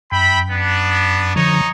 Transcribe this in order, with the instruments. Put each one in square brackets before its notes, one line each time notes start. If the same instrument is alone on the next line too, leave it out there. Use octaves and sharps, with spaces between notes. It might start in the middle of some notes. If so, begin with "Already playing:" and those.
[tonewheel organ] F#2 [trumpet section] E5 G5 B5
[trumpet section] B3 D4
[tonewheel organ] D3 F3 [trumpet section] D#4 C#5